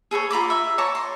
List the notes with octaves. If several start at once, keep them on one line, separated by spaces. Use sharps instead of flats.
G#4 A4 B4 C#5
F4 A#5 B5 D6
E5
C#5 A5 A#5 D6
C6